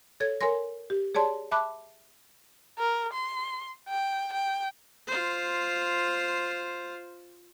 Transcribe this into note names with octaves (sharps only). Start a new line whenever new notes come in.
A4 C#5 G#6
A#4 C#5 G#5 C6 A#6
G4
G#4 C#5 D5 A5 C6
E5 A5 B5 D6 F#6
A#4
C6
G5
G5
F4 C5